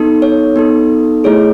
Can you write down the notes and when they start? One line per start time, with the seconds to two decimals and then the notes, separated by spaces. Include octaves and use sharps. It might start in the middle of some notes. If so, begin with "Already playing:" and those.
Already playing: B3 D#4 A4
0.22 C#5
0.56 B3 D#4 A4
1.24 A3 E4 G#4 C#5